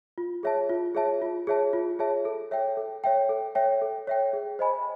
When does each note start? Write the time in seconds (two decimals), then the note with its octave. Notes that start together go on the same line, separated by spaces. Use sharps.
0.18 F4
0.43 G#4 C#5 E5 A5
0.69 F4
0.95 G#4 C#5 E5 A5
1.22 F4
1.47 G#4 C#5 E5 A5
1.73 F4
1.99 G#4 C#5 E5 A5
2.25 A4
2.51 C#5 E5 G5
2.77 A4
3.04 C#5 E5 G5
3.29 A4
3.55 C#5 E5 G5
3.82 A4
4.07 C#5 E5 G5
4.33 G#4
4.59 C5 D#5 G#5 B5